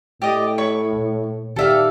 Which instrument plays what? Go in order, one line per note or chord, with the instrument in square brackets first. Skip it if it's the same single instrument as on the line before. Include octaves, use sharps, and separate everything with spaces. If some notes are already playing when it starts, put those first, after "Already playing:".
[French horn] A2 [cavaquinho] G4 D5 D#5
[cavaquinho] C#5 B5 C#6
[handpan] A#2
[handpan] D#3 G4 D5 [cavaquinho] A4 E5 F5